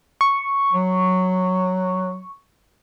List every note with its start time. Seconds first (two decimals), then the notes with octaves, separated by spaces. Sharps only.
0.21 C#6
0.73 F#3